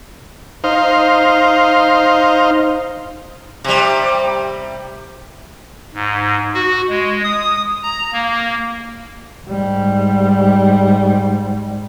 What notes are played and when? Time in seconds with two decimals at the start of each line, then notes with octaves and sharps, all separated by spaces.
0.64 D#4 C5 F5
3.64 C3 G3
5.94 G#2
6.54 F#4
6.89 G#3
7.24 D#6
7.83 A#5
8.13 A#3
9.47 G#2 G3